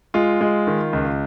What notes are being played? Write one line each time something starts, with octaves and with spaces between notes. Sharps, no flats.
G#3 F4
G#3
D#3
C#2